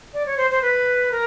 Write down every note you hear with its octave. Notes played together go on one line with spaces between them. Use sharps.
D5
C#5
C5
C5
B4
A#4